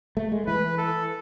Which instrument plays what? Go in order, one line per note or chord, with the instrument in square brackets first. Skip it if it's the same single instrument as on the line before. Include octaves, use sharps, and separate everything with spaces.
[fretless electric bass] A3
G#3
[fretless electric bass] E3 [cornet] B4
[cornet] A4